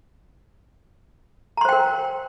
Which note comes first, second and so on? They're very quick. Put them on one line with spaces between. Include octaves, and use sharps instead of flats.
A#5 C6 C5 G5 A#4